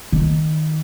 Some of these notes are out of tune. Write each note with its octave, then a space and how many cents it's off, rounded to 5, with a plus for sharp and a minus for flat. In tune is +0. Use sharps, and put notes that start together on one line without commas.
D#3 +0